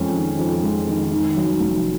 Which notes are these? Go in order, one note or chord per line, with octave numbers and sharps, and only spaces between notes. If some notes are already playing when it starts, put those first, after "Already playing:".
Already playing: F2 G#3 C#4
D#3
F2
G#3
D#3
D#3
F#3
F1